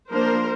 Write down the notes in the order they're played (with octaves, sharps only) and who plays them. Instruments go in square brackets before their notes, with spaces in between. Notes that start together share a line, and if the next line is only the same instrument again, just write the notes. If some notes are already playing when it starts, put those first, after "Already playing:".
[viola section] F3 A#3 D4 A#4 C5